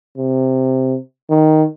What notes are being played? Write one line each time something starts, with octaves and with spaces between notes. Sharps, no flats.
C3
D#3